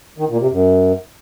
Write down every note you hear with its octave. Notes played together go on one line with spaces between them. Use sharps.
D#3
A#2
C3
F#2